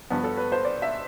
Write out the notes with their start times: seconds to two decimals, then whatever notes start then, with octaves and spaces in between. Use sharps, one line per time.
0.10 G2 F3 B3
0.24 A4
0.37 B4
0.52 C5
0.64 D5
0.82 E5